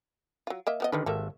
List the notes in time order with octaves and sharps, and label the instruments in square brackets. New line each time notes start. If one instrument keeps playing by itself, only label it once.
[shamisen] F#3 F4
A#3 D#5 E5
F3 B3 D#5
[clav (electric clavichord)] D3 D#3 [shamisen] G3 D4 B4
[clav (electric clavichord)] G#1 E5 [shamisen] G3 A#3 A4